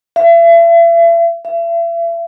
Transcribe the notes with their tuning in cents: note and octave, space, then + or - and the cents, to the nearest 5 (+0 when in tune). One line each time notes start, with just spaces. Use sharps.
E5 +40
E5 +40